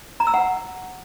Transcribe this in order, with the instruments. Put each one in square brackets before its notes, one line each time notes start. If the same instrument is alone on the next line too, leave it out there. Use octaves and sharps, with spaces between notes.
[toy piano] A#5
E6
F#5